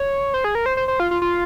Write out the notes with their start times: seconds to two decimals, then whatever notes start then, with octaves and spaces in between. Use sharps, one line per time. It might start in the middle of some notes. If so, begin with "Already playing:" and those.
Already playing: C#5
0.34 C5
0.44 G#4
0.55 A#4
0.66 C5
0.77 C5
0.88 C5
1.00 F4
1.11 F4
1.22 F4